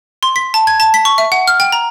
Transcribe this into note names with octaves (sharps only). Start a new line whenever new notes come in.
C6
B6
A5
G#6
A5
B6
C#6
E5
F#5
F6
G5
A#5